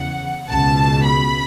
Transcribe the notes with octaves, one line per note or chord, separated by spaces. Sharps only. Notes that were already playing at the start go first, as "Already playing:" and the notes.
Already playing: E2 C#3 E3 F#5
C#2 B2 A5
B5